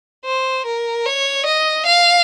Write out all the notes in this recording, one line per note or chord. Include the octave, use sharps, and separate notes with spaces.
C5
A#4
C#5
D#5
F5